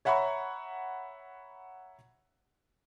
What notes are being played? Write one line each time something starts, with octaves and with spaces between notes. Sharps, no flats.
C#5 E5 F#5 A#5 B5 C#6